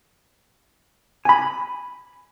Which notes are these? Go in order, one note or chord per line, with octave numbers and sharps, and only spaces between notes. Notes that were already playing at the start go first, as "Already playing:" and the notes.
G#5 B5